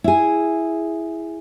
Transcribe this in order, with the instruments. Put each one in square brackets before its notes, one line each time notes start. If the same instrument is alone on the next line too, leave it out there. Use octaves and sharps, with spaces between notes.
[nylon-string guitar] E4 G#4